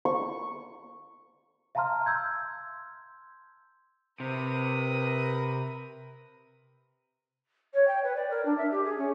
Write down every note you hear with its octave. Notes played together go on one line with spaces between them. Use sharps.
C#6
E5 F5 A5 A#5 C6 F6
C6 E6 G6 G#6
C3 A#4 B4 D#6
C#5
G5
B4
D5
A#4
D4
E5
G4
G#4
C#4